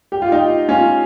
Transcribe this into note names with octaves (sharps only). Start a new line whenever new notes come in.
G4
F4
D#4 G4
C#4 F4